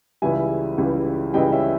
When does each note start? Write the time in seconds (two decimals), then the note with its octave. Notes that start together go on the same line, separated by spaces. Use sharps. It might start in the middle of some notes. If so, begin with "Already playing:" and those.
0.22 C#2 C#3 E3 G3 E5 G#5
0.78 C#2 C#3 E3 G3
1.34 C#2 C#3 E3 G3 D#5 G5
1.52 C#5 E5